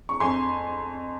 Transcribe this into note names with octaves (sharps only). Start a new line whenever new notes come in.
C#6
F2 G#5 C6